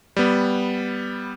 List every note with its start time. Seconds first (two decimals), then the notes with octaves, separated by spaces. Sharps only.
0.17 G3 B3